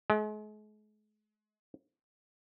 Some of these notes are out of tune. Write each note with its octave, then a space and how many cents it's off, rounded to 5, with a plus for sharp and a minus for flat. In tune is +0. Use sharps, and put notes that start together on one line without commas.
G#3 +40